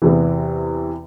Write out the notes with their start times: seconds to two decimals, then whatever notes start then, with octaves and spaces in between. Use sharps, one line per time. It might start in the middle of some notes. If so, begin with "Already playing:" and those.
0.02 E2 C3 E3